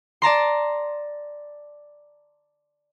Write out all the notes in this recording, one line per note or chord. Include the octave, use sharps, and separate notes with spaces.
D5 A5 A#5 C6